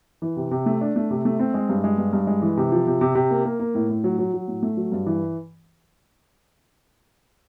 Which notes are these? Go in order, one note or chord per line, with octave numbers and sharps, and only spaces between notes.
E3
C3
C3
A3
D4
A3
C3
A3
C4
G#3
G2
G#3
G2
G2
G#3
E3
C3
F3
C3
C3
C3
A#3
A#3
A#3
A2
A2
F#3
F#3
F#3
A2
A3
F#3
G2
E3